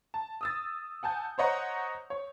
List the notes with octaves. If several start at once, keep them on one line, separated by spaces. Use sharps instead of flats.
A5
D#6 E6 A6
F#5 G#5 A5 G6
C5 C#5 D#5 F#5 A#5
C#5